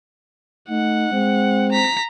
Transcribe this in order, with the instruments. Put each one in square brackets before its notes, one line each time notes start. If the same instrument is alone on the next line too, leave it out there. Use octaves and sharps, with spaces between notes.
[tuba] A3 [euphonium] D#4 [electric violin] F#5
[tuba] G#3 [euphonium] C4
[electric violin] A#5 B6